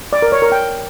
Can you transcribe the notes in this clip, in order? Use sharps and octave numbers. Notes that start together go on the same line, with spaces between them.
D5
A#4
C#5
A#4
G5